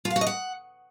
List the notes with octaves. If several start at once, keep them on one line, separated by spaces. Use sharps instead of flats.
F4
F5
F#4
D#5
F#5